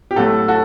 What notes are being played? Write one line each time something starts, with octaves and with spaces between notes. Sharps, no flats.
G4
A2 F#3 A3 F#4 A4
F#4 A4